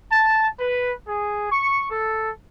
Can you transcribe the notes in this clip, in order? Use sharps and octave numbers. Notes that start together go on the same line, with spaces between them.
A5
B4
G#4
C#6
A4